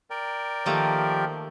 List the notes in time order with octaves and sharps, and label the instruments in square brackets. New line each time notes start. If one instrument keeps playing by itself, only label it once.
[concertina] A#4 D5 G5
[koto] D#3 A3 A#3 [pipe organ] F3 G4